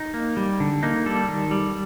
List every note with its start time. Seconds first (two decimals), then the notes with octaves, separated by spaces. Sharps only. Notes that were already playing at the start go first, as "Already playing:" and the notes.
Already playing: D#4
0.14 A#3
0.37 G3
0.60 D3
0.83 A#3 D#4
1.06 G3 A4
1.29 D#3
1.51 G3